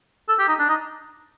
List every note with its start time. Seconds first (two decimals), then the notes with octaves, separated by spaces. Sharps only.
0.29 A4
0.39 G4
0.49 D#4
0.59 D4
0.69 D#4